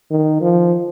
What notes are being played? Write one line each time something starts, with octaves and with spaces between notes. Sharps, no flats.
D#3
F3